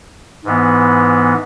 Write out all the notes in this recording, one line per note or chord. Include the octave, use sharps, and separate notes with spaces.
G#2 E3 B3